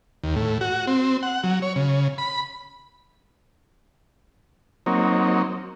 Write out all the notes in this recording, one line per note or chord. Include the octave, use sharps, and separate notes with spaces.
D#2
A2
F#4
C4
F#5
F#3
C#5
C#3
B5
F#3 A#3 C4 D#4 C#5